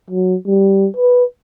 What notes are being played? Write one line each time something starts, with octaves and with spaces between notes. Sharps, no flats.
F#3
G3
B4